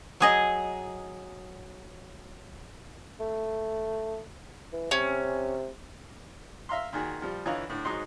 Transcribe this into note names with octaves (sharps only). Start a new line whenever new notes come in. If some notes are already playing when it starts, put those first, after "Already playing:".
F#3 G#4 D#5
A3
E3
C3 C#4
E5 F5 A#5 C6
A#2 D#3 F#4 G#4
F3 G3
D3 E3 F4 C#5 D#5 A#5
A2 D3
G#2 F#3 D#4 C6